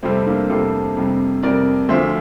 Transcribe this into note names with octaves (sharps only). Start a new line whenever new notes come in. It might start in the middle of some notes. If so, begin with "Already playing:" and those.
F2 C3 G3 A3 C4
A#3 D4
F2 C3 G3 A4 C5
F2 C3 G3
F2 C3 G3 A#4 D5
D2 D3 F3 C5 E5